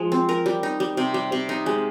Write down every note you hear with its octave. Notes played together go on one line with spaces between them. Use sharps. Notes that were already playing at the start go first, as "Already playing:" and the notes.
Already playing: F3 G#3
C4
A#4
G3
D#4
G3
C3
G3
C3
D#4
G#3